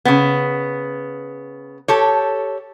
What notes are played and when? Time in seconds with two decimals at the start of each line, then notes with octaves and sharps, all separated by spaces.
0.05 C#3 B3
1.88 G4 A4 C#5